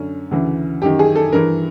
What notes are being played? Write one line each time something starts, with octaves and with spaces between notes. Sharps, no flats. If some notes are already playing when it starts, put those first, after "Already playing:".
Already playing: F#2 D3 C#4
D2 C#3 E3
F#2 D#3 G4
G#4
A4
G2 E3 A#4